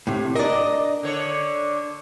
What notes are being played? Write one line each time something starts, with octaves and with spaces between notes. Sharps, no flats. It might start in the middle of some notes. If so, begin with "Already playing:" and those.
A2 C3
D4 A#4 D5 D#5
D3 C#5